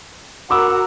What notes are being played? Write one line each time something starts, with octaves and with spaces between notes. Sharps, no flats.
F#4 A#4 B5 D6 E6